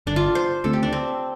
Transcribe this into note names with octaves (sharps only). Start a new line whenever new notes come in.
G1 G2 D3 D4
F4
C5
D2 D3 A3 C4 A4
G4
D4
C4